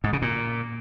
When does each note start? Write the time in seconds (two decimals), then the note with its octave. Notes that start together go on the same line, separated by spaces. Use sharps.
0.04 G#2
0.13 C#3
0.22 A#2